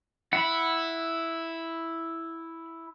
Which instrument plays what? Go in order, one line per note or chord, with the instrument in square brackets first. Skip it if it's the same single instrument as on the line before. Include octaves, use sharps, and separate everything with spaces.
[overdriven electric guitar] E4 [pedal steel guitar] F#5 B5